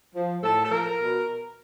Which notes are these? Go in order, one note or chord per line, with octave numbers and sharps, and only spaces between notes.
F3
A2 A4
A4
F3 A#4
B2